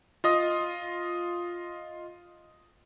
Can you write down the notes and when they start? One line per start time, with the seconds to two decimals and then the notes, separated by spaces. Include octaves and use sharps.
0.24 F4 D#5 D#6